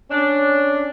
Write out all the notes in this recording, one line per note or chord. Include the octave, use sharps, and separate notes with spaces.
C#4 D4